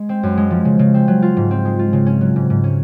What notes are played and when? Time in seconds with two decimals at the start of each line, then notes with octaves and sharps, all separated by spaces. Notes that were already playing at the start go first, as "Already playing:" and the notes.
Already playing: G#3
0.09 C4
0.23 F#2
0.37 G#3
0.51 F3
0.65 C#3
0.79 C#3
0.94 C4
1.08 F#3
1.22 F4
1.37 G#2
1.51 C4
1.65 G#3
1.79 F4
1.93 C#3
2.06 C#4
2.21 F#3
2.36 G#2
2.50 G#2
2.64 C#4